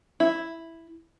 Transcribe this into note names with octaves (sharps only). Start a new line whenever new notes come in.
E4